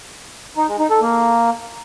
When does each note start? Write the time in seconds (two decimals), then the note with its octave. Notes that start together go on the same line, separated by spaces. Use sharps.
0.57 D#4
0.68 G#3
0.79 D#4
0.90 A4
1.02 A#3